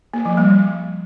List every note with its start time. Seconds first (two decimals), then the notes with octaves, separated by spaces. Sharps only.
0.14 A#3
0.25 F3
0.37 G3